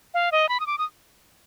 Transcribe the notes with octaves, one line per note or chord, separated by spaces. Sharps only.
F5
D#5
B5
D#6
D6
D#6